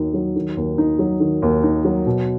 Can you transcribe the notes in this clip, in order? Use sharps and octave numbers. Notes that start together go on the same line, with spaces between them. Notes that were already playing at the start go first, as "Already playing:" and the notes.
Already playing: D#2 D#3 F#3 D#4
F#3
D#3
D#2
D#4
F#3
D#3
D#2
D#4
F#3
B2